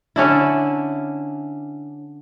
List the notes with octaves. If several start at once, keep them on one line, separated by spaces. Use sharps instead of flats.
D3 C#4 D4 E4